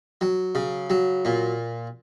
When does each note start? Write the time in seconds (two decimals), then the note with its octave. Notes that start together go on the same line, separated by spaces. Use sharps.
0.21 F#3
0.55 C#3
0.90 F#3
1.25 A#2